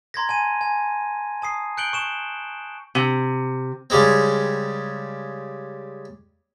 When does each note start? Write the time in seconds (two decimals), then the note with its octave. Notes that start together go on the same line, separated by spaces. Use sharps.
0.14 A#5 C6 G#6 A#6
0.29 G#5 A5 D#7
0.61 G#5
1.42 A5 D#6 C7
1.77 F#6 G6 C#7 D7 F#7 G7
1.93 C#6 E7 G7
2.95 C3
3.90 C#3 G3 G#3 C4